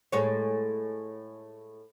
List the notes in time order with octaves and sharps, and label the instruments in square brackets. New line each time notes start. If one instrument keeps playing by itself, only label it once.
[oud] A2 G#3 C#5